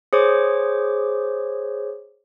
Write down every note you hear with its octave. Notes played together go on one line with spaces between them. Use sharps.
G#4 C5 C#5 D6